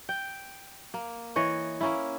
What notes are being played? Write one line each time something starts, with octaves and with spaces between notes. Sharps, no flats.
G5
A#3
E3 C#5 D#5
A#3 C#4 E4